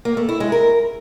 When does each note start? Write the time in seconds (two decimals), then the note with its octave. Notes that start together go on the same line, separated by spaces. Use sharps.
0.05 A#3
0.17 A3
0.29 E4
0.40 G#3
0.52 A#4